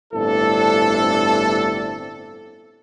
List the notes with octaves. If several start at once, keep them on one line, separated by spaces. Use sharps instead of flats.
G1 A2 C4 D4 E4 A4